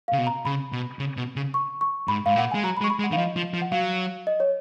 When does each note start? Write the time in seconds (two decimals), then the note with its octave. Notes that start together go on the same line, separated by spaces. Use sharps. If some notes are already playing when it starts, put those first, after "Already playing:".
0.08 C#3 F5
0.18 B2
0.27 A#5
0.45 C#3 B5
0.72 B2
0.99 C#3
1.17 B2
1.36 C#3
1.54 C#6
1.81 C#6
2.08 G#2 B5
2.26 G#2 F5
2.36 A#2 F#5
2.51 G#3 G#5
2.63 F#3 A#5
2.77 B5
2.81 G#3
2.84 C#6
2.90 B5
2.99 G#3
3.04 F#5
3.11 D#3 F5
3.17 F3 D#5
3.36 F3
3.54 F3
3.62 F#5
3.72 F#3 F5
4.27 D#5
4.40 C#5